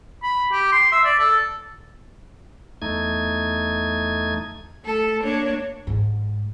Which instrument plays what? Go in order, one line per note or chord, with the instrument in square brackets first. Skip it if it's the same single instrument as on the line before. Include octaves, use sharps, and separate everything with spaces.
[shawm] B5
G4
C6
E5
D5
A4
[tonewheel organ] E2 A3 D#4 G#6
[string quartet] A3 A4
A#3 D4 C#5
[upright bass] G#2